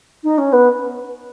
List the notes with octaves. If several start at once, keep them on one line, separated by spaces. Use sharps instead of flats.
D#4
C#4
B3